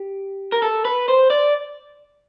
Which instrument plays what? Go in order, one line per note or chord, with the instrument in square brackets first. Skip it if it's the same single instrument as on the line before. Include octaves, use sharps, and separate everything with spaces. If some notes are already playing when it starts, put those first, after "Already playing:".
Already playing: [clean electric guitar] G4
A#4
A4
B4
C5
D5